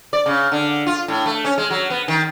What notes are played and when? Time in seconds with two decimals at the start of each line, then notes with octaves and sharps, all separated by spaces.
0.13 D5
0.26 C#3
0.52 D3
0.87 F4
1.08 A2
1.26 A3
1.45 C#4
1.58 G#3
1.70 F#3
1.90 B3
2.08 D#3